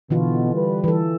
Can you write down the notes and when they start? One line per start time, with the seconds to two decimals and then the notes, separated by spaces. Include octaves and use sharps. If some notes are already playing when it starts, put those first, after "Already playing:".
0.10 B2 D3 E3 F4
0.54 G3 B4
0.84 E3 A4